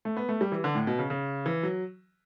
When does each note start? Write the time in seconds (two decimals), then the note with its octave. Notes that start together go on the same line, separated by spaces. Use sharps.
0.05 A3
0.17 B3
0.29 A3
0.41 G3
0.52 E3
0.64 D3
0.75 A2
0.87 B2
0.99 C#3
1.10 C#3
1.46 E3
1.63 F#3